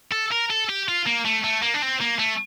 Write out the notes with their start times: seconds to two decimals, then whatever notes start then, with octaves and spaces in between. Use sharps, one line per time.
0.12 A4
0.32 A#4
0.50 A4
0.69 G4
0.89 F4
1.06 A#3
1.25 A3
1.44 A3
1.63 A#3
1.74 D4
1.82 C4
2.01 A#3
2.19 A3